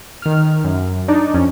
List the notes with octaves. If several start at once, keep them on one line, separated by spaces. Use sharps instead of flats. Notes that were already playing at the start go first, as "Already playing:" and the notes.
D#3 F6
F#2
D4 D#4 D5
F2 C#4